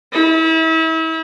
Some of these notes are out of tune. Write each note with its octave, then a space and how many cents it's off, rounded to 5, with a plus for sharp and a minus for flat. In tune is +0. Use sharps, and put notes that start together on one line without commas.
E4 -35